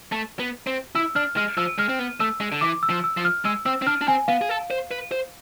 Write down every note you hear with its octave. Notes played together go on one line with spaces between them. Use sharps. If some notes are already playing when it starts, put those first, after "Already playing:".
A3
B3
C4
E4 E6
D4 F6
G#3 F6
F3 E6
G#3 F6
C4
B3
A3 E6
G#3
D3
E3 D6
E6
F3
E6
F3
F6
G#3 E6
C4 E6
C4
D4 F6
D4
C4 G#5
B3 F5
G#4
A4
C5
B4
C5